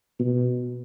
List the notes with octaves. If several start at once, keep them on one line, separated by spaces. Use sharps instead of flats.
B2